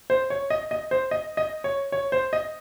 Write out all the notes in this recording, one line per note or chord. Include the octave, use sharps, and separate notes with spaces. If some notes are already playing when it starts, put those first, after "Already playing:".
C5
C#5
D#5
D#5
C5
D#5
D#5
C#5
C#5
C5
D#5